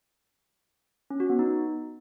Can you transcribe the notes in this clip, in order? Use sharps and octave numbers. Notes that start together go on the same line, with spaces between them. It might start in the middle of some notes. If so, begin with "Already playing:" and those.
C#4
F#4
B3
D#4